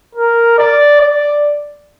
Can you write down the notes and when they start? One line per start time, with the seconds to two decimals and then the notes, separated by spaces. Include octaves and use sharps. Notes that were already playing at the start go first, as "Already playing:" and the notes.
0.15 A#4
0.58 D5
1.01 D5